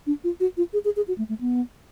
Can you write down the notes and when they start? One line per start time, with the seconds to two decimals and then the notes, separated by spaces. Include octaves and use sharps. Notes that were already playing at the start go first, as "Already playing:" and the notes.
0.07 D4
0.24 F4
0.40 F#4
0.57 F4
0.73 G#4
0.85 G#4
0.96 G#4
1.08 F#4
1.18 A3
1.29 A3
1.41 B3